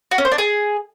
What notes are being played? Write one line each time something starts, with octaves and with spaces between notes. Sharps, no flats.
F#4
C#4
C5
D4
G#4